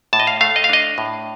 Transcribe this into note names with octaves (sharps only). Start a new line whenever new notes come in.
A2 A5
D#5
F5
A3 F5
D#5
F5
D4 D#5
A2